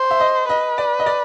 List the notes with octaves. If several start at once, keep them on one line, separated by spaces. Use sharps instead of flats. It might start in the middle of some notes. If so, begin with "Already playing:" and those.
Already playing: C5
E5
D#5
B4 D#5
D5
D#5
D5